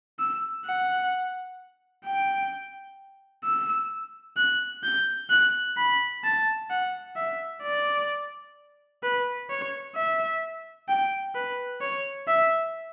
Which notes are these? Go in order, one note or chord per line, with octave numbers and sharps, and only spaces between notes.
E6
F#5
G5
E6
F#6
G6
F#6
B5
A5
F#5
E5
D5
B4
C#5
E5
G5
B4
C#5
E5